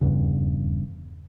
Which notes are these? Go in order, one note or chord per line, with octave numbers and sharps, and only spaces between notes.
D#1 E2 G2 C#3